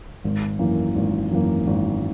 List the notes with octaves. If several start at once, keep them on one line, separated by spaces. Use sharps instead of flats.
G#1
F#2 E3 A#3
G#1
F#2 E3 A#3
G#1